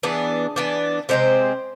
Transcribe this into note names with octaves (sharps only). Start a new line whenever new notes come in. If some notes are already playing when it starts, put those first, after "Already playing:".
E3 B3 D4 G#4
E3 B3 D4
C3 G#3 C4 C5